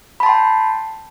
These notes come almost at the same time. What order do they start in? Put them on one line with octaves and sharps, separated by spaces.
B5 A5 C6 G5